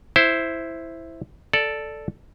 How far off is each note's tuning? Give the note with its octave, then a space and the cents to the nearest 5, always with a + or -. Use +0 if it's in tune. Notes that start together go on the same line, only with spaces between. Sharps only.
E4 +0 C5 +0
A4 +0 D5 +0